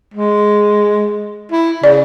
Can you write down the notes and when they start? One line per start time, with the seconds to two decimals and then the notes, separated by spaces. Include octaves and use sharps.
0.14 G#3
1.52 E4
1.84 C#3 D5